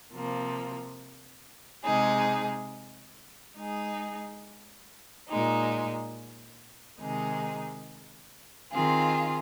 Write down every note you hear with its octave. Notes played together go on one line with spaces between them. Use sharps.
C3 F3 A#3
C3 G#3 D#4 G#4
G#3 D#4 G#4
A#2 G#3 D#4
C3 D#3 G#3 D#4 G#4
D#3 C4 F4 G#4